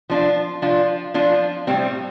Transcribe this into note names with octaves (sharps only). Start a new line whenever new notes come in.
F3 D4 F4
F3 D4 F4
F3 D4 F4
A2 G3 C4